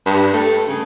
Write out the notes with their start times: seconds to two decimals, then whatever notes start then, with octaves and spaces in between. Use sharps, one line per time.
0.06 G2
0.34 A3
0.69 C#3